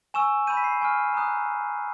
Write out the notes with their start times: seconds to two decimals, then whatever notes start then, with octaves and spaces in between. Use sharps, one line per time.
0.14 G#5 C#6 E6 E7
0.47 B5 E6 G6 D#7
0.57 B6
0.64 C7
0.81 G#5 C#6 F6
1.14 A#5 D#6 F#6